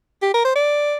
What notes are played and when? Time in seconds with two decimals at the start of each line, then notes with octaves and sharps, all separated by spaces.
0.22 G4
0.34 A#4
0.45 C5
0.55 D5